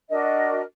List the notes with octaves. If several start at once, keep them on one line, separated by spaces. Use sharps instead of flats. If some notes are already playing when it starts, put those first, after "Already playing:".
D4 F#4 A#4 D#5